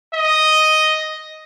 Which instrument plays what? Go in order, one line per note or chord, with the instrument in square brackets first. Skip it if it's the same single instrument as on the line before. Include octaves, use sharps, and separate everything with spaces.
[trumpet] D#5